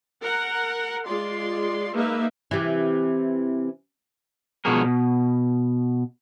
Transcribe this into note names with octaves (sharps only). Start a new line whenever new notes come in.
A#4 F#5
G#3 F4 D5 C6
G#3 A#3 D#4 B4 E5
C3 E3
B2 F3 G#3 F#4 G#4 A#4
B2